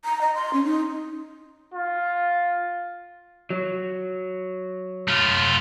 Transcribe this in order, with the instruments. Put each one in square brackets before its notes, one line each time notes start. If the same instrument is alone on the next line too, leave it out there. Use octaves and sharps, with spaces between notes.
[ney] A#5
D#5
C6
C#4
D#4
[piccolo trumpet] F4
[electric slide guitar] F#3
[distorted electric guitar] A3 F4